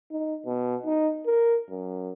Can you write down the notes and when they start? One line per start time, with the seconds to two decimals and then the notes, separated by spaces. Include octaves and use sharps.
0.11 D#4
0.46 B2
0.85 D#4
1.26 A#4
1.70 F#2